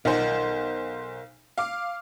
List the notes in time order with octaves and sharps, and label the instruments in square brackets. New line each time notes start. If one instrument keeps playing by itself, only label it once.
[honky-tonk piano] B1 C5 [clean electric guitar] A#4 D#5 F#5
[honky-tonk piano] F5 D6